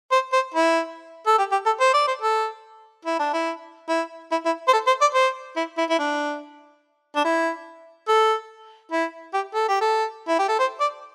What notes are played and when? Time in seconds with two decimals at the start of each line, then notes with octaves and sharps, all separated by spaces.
0.12 C5
0.33 C5
0.54 E4
1.27 A4
1.38 G4
1.52 G4
1.66 A4
1.80 C5
1.94 D5
2.07 C5
2.22 A4
3.05 E4
3.19 D4
3.33 E4
3.89 E4
4.31 E4
4.46 E4
4.68 C5
4.73 A4
4.87 C5
5.01 D5
5.14 C5
5.56 E4
5.78 E4
5.90 E4
5.98 D4
7.16 D4
7.25 E4
8.09 A4
8.92 E4
9.34 G4
9.54 A4
9.69 G4
9.81 A4
10.28 E4
10.39 G4
10.49 A4
10.59 C5
10.80 D5